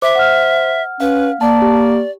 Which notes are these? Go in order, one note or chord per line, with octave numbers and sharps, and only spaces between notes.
C5 E5 D6
F#5 F6
C#4 B4 F5
A#3 D5 A5
G4